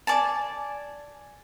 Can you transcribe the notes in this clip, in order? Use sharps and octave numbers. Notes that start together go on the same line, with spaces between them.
D5 G#5 A5